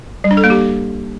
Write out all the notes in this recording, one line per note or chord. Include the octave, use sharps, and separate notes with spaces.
G3
D4
A4
A#3
G4